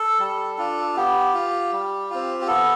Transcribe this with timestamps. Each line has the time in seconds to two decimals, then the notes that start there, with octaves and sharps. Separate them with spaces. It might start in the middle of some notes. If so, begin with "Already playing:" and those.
Already playing: A4
0.19 G3
0.58 D4 F4
0.96 B3 G4
1.34 F4
1.72 G3
2.10 C4 F4
2.41 G4
2.47 B3 A4